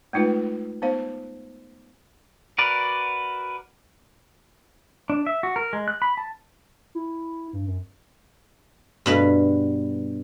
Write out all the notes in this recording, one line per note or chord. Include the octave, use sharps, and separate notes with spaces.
G#3 A3 D#4 F4 B4
B3 D#4 C5 F5
F#4 A#4 B4 D5
D4
E5
F#4
A#4
G#3
F#6
B5
A5
E4
G2
F#2
G2 B2 B4